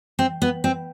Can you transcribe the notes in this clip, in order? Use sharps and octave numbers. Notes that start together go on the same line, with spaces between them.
C4
B3
C4